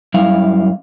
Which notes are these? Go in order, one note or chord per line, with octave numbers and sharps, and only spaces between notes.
F#2 G3 E4 F5